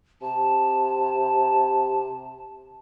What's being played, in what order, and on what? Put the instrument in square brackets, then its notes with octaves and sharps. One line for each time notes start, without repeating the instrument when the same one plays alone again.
[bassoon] C3 [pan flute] A5